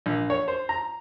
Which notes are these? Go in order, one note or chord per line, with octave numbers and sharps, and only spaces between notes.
A#1
C#5
C5
A#5